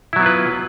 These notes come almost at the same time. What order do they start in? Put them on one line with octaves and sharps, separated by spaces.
E4 F#3 B3 F4 B4